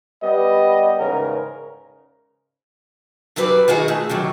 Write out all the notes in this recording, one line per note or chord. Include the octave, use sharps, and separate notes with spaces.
G3 B3 D#5
E2 G#2 C#3 A#4
F#2 F#3 G3 B4 D5
D#3 D#4 F4 F#4 G#4 D#5
A3
D3 D#3 F#3 G3